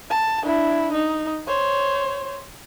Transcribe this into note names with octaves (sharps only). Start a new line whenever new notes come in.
A5
D4 E4
D#4
C5 C#5